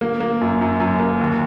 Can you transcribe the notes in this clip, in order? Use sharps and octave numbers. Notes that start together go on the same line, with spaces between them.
A#3
A#3
F#2
F#2
F#2
A#3
D#2